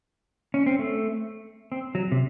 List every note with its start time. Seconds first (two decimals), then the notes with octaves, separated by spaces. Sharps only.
0.54 C#4
0.66 C4
0.79 A3
1.72 C4
1.95 F#3
2.12 C3